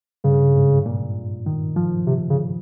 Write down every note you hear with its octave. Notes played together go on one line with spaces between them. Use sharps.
G2 C#3
G#2
A#2
D#3
F3
C3
C#3